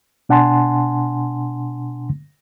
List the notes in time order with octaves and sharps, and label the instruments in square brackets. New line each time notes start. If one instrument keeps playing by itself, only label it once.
[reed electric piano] B2 D4 F#5 G#5 A5 C6